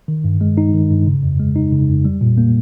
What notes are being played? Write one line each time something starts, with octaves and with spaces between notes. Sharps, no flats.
D#3
G2
G#3
D#4
D#3
G2
C#3
F2
G#3
D#4
C#3
F2
G3
A#2
A#3